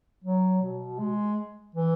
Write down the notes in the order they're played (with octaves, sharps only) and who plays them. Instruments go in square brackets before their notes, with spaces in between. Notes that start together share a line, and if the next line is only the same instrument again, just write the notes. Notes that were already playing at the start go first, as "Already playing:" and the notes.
[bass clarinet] F#3
B2
G#3
E3